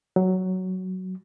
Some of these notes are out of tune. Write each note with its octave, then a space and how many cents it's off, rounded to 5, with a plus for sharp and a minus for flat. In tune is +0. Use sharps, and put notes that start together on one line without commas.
F#3 +10